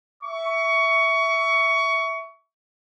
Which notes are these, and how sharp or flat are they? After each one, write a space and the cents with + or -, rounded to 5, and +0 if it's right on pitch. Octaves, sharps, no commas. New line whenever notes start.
E5 +0 C#6 +20